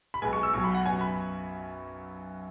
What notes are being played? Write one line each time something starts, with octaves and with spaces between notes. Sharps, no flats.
B5
B1 B2 G#3 B3 G#5
C#6
E6
B1 B2 F#3 C#6
B5
F#5
F#2 F#3 B3 G#5
B5